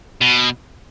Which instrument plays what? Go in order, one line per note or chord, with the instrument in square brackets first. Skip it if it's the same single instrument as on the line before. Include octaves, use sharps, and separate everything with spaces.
[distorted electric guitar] B2